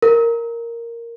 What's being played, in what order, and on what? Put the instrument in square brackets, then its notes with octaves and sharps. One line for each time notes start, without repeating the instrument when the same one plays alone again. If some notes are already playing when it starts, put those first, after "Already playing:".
[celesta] A#4